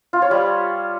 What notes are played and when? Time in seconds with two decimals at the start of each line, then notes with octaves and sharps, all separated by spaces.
0.13 F4
0.22 C#5
0.31 G3